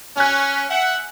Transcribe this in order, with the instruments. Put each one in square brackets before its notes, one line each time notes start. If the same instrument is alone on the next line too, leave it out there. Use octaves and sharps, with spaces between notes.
[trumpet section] C#4 [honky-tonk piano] G#5 F#6
[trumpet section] E5 F#5